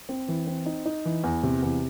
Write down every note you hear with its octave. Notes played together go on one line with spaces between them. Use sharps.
C4
E3
C4
D#4
D#4
E3
E2
C3
E2